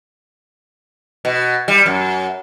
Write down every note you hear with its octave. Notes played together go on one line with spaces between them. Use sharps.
B2
G3
F#2